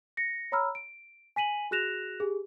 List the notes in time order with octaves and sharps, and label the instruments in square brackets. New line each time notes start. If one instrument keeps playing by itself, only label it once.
[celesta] A#6 C#7
C#5 A#5 B5 E6 F6
D7
G#5 B6 D#7 F#7
F#4 G#4 F#6 A#6 E7 F7
G4 G#4